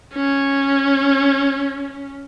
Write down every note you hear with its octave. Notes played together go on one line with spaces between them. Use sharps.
C#4